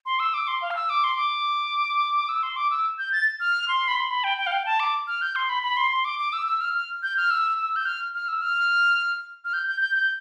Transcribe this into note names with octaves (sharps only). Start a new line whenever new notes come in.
C6
E6
D6
C6
F5
F6
E6
D6
C6
D6
E6
C6
D6
E6
G6
A6
F6
C6
B5
C6
B5
G5
G5
F5
G5
A5
D6
F6
G6
C6
B5
B5
C6
C6
D6
D6
E6
E6
F6
F6
G6
F6
E6
E6
G6
F6
F6
E6
F6
F6
G6
G6
G6
G6